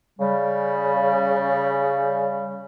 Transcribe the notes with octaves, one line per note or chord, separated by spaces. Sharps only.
C#3 G3